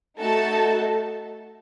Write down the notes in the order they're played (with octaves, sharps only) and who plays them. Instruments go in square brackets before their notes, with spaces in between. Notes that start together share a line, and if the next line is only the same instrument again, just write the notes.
[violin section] A3 D#4 F#4 A4 A5